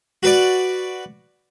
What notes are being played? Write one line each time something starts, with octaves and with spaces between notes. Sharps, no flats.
F#4 B4 D5